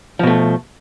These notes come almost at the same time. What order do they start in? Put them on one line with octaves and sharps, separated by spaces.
F3 B2 A3